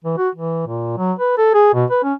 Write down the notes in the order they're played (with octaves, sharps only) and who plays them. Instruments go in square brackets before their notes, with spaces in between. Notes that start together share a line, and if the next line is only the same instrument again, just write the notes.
[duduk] E3
F#4
E3
A#2
F#3
B4
A4
G#4
B2
B4
C#4